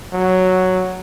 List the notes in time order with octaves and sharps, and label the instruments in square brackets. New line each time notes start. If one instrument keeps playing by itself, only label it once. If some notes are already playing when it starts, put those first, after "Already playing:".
[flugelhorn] F#3